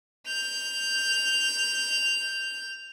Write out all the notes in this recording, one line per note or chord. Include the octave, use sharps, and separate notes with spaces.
G6 F7